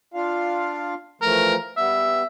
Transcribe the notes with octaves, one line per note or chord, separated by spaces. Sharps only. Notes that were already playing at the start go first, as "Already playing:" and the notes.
D4 F4 F5
E3 F3 A3 A#4
G3 B3 E5